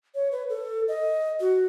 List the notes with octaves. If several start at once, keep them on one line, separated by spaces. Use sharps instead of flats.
C#5
B4
A4
D#5
F#4